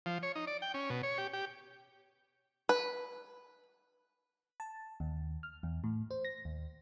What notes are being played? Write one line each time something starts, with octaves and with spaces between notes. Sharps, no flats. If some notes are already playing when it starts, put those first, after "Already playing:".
F3
C#5
D#4
D5
G5
C#4
B2
C#5
G4
G4
B4
A5
D#2
F6
E2
A2
C5
A#6
D#2